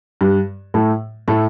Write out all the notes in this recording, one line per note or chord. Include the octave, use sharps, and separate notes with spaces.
G2 G3
A2 A3
A2 A3